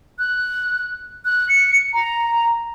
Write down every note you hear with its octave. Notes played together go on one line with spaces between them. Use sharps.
F#6
F#6
C#7
A#5